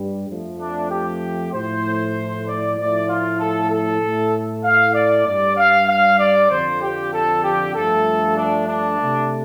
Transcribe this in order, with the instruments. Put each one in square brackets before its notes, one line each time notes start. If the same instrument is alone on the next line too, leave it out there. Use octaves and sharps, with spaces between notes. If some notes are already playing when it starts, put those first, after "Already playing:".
Already playing: [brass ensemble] G2 G3
F2 F3 A3
D4
G4
A2 F3 A3 C5
D5
A2 F3 A3 D5
F4
A4
A4
A2 A3
F5
D5
G2 G3 D5
F5
F5
D5
F2 D3 F3 C5
G4
A4
G4
G2 F3 A3 A4
D4
D4
C3 A3